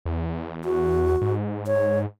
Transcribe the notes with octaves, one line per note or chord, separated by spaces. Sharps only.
E2
F#4
G#2
C#5